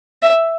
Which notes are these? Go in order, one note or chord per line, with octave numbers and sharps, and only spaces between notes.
E5